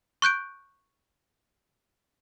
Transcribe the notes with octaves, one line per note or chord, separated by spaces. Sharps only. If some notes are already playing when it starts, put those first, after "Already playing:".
C#6 F#6 G6 D7